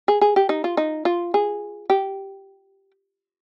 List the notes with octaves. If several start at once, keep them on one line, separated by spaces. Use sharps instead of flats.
G#4
G#4
G4
D#4
F4
D#4
F4
G#4
G4